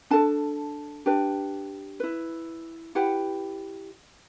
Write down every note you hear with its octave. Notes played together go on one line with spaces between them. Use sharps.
D4 A4 A5
D4 G4 B4
E4 B4
E4 G4 B4 F#5